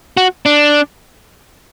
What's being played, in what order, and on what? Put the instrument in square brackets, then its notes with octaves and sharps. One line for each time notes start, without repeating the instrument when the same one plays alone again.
[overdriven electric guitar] F#4
D4